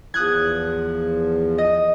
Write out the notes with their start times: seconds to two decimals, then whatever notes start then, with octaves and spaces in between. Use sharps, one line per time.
0.14 E2 F3 D#6 F#6 G#6
1.58 D#5